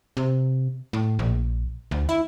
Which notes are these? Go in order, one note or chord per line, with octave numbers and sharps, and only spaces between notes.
C3
A2
A#1
D2
E4